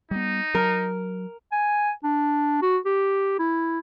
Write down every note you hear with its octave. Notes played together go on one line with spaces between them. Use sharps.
G3 B3 D#4
F#3 A#4
G#5
D4
F#4
G4
E4